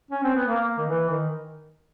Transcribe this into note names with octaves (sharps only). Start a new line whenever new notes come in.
C#4
C4
B3
A#3
D#3
E3
D#3